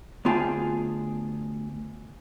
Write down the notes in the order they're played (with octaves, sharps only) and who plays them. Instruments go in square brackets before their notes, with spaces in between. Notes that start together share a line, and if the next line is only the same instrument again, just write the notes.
[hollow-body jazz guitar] D2 B3 F4 G#4 G5 A5